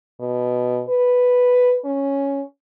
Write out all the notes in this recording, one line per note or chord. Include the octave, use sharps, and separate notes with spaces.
B2
B4
C#4